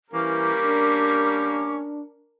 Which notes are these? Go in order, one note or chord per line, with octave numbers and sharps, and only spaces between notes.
E3 G3 A#3 C#4 A#4 D6
D4